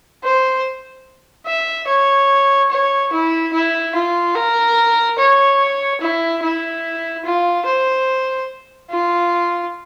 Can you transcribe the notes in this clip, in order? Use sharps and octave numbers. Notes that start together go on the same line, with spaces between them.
C5
E5
C#5
C#5
E4
E4
F4
A#4
C#5
E4
E4
F4
C5
F4